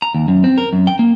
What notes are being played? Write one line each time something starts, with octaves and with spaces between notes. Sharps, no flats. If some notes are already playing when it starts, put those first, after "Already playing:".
A#5
D#2
F#2
C4
A#4
F#2
G5
A#3